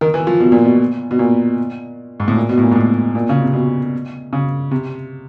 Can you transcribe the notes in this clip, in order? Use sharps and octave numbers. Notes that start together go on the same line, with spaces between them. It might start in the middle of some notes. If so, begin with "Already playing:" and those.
D#3
E3
F3
B2
A#2
B2
B2
A#2
G#2
A2
A#2
B2
A2
A#2
G#2
A2
A#2
C#3
C3
B2
C#3
C3